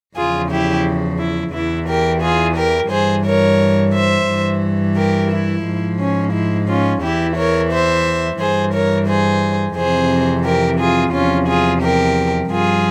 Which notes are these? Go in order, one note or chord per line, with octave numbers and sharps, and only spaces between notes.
E2 C#3 F3 F4 G#4
E4 G4
E4
E2 E3 E4
G4 A#4
F4 G#4
G4 A#4
G2 E3 G#4 C5
A#4 C#5
C5 E5
G2 E3
G4 A#4
E4
G#2 F3
C#4
E4
C#4 F4
E2 E3 E4 G4
A#4 C#5
C5 E5
G2 E3 G#4 C5
A#4 C#5
G#4 C5
F2 C3 E3 G#4 C5
G4 A#4
F4 G#4
E2 C3 F3 C#4 F4
F4 G#4
G4 A#4
G2 F3 F4 G#4